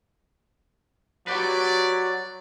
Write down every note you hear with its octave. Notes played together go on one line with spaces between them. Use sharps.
F#3 F#4 G4 B4 D5